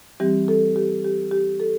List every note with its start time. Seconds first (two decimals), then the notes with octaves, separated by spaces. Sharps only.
0.20 E3 G3 C4 G4
0.48 A4
0.76 G4
1.04 G4
1.31 G4
1.60 A4